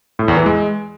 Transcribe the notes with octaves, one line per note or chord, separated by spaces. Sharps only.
A2
E2
E3
G#3